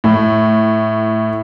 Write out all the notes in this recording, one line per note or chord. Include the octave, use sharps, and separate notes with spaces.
A2